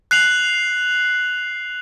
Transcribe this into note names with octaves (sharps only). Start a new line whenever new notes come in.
F#6 C7 F7 F#7